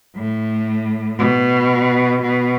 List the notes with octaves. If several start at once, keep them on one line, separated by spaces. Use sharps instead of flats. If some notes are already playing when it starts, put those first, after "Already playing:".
A2
B2
B2